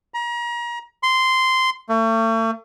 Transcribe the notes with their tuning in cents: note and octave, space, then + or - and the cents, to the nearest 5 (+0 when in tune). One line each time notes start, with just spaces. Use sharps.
A#5 +35
C6 -10
A3 +40